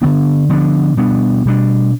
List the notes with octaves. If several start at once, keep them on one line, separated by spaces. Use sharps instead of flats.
D3 F3 B3 D4
D3 F3 B3 D4
B2 G3 B3 D4
B2 G3 B3 D4